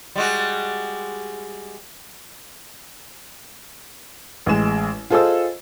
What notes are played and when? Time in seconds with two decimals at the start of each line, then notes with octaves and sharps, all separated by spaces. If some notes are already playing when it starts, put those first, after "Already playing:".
0.16 G3 G#3 F#4
4.46 A1 G#3 G#4 E7
5.10 F4 G#4 A4 C5 D#5 E6